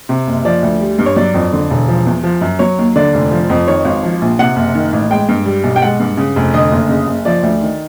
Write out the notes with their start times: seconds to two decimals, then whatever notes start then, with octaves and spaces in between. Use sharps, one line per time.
0.09 C3
0.27 F#1
0.45 F3 D5
0.63 D2
0.81 G3
0.99 G2
1.06 C#5
1.16 F#3 D5
1.34 F2
1.53 D3
1.70 E1
1.88 F3
2.06 E2
2.24 F3
2.41 F#2
2.59 F#3 C#5
2.78 D#2
2.96 D3 D5
3.14 F1
3.31 F3
3.50 F2
3.67 D#3 C#5
3.85 G#1
4.03 F3
4.21 A#1
4.39 C3 F#5
4.56 F#1
4.75 D#3
4.93 A1
5.10 G#3 G5
5.29 G2
5.46 G3
5.64 B1
5.76 G5
5.82 G#3 F#5
6.00 G2
6.17 C#3
6.36 F1
6.54 D3 D#5
6.71 F#1
6.89 C#3
7.07 F#1
7.25 F3 D5
7.43 D2
7.61 D#3